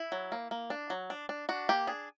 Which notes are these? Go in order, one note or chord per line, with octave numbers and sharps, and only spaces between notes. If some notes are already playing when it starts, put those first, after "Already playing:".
Already playing: E4
F#3
A#3
A#3
D4
F#3
D4
D4
D4 F#4
A#3 G4
D4 G#4